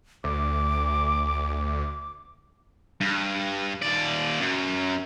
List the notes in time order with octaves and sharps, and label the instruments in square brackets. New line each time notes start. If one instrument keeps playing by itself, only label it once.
[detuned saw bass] D2 [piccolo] D6
[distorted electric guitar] G2
D#2 D5
F#2